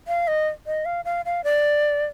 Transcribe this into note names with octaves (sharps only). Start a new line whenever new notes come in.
F5
D#5
D#5
F5
F5
F5
D5